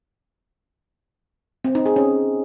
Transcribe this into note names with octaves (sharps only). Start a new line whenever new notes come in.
C4
D#4
G#4
C#4